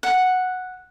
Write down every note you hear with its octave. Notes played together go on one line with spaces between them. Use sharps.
F#5